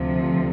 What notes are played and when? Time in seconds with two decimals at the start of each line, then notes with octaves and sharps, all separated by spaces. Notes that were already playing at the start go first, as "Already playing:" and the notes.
Already playing: D2 C3 F3